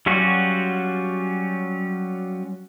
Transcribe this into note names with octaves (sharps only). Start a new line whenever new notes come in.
F#3 G3 C#4 F4 F#4